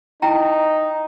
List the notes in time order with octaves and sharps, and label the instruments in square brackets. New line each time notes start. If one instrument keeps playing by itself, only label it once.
[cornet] D#4 [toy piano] E4 G5 A#5